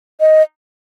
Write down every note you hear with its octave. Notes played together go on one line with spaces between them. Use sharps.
D#5